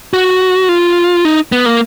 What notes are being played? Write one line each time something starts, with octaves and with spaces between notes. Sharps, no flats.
F#4
F4
D#4
B3
A#3